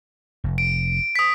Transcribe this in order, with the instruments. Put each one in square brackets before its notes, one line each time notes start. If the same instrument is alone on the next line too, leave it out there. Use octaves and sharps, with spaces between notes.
[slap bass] F1
[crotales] D7
D#6 B6